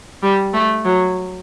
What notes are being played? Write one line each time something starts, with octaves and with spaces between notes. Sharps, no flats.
G3
A3
F#3